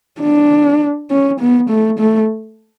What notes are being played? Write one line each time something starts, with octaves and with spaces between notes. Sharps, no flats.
D4
C#4
B3
A3
A3